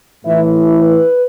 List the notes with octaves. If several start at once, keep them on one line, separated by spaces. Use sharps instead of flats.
A2 E3 E4
B4